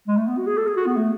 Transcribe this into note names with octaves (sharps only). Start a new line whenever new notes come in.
G#3
A3
B3
F#4
G#4
A4
G#4
F#4
B3
A3